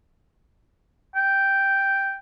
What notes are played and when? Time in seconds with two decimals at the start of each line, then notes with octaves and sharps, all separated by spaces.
1.16 G5